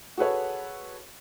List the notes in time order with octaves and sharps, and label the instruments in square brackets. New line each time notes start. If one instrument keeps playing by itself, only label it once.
[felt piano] F#4 G#4 A4 B4 C#5